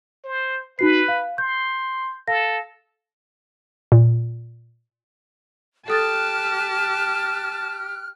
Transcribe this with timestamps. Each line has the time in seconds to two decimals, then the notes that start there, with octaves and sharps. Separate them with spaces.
0.24 C5
0.79 D#4 F#4 B4 C7
1.08 F5
1.38 C6 G6
2.28 A4 F5 A#6
3.92 A#2
5.88 G4 A4 A5 D#6 F6 F#6 A6